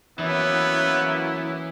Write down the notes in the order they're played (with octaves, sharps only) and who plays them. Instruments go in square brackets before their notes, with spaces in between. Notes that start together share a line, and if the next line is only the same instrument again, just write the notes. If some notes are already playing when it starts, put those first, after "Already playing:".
[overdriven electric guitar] E3 [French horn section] F#3 A#3 C#4 [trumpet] B3 [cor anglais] E4